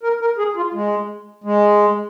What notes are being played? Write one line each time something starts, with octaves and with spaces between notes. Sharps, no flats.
A#4
A#4
G#4
F4
G#3
G#3